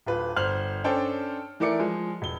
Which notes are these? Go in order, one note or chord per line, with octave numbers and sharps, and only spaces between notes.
D1 F4 B4
G1 C5 F6 F#7
C#4 D4 A4 C5 G5 A5
E3 A3 A#4 D5 D6 C#7
F3 G#3
E1 G7